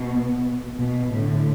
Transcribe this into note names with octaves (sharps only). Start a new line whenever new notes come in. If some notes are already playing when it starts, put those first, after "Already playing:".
Already playing: B2
B2
A2 D3